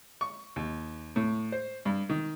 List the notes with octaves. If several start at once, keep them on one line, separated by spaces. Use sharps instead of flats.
C#6
D#2
A2
C5
G2
D#3